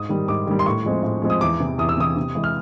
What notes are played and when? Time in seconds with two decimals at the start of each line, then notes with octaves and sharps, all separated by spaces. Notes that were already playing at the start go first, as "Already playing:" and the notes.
Already playing: G#2 D#6
0.09 D#3 G3
0.28 G#2 D6
0.47 D#3 G3
0.59 C6
0.66 A2 C#6
0.85 F3 G#3 C4
1.03 A2
1.22 F3 G#3 C4
1.30 D#6
1.41 E2 D6
1.60 C3 E3
1.78 E2 D#6
1.89 E6
1.97 C3 E3 D#6
2.17 C3
2.35 E3 G#3
2.44 F6